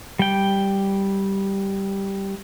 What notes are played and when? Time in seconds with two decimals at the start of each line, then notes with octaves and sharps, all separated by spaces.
0.19 G3 G5